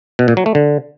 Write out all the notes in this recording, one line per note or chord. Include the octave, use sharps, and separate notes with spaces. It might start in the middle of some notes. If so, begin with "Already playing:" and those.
B2
A#2
F#3
A3
D3